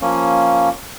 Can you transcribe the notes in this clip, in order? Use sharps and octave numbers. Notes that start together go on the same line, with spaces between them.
F3 A#3 C#4